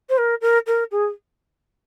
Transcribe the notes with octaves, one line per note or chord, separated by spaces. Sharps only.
C5
A#4
A#4
A#4
G#4